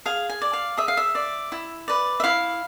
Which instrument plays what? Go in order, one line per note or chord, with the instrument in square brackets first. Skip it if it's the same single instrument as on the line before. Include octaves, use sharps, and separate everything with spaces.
[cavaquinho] G#4 F5
G#5
D5
F5
G#4 E5
F5
E5
D5
E4
B4 D5
E5
E4 F5